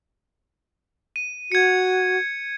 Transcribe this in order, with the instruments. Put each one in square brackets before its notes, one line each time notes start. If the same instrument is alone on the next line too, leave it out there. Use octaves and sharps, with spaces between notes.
[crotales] D#7
[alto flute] F#4 [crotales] G#6 C#7